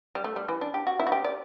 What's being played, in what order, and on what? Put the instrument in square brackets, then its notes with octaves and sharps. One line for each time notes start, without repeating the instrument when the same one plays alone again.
[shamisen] G3
A3
G3
E3
D4
G4
F#4
E4
F#4
G4
D5